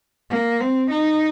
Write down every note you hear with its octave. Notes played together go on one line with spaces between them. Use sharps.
A#3
C4
D#4